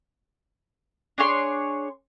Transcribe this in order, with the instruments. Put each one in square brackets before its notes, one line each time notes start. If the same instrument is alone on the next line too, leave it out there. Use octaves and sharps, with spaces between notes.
[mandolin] D4 G#4 C#5 C6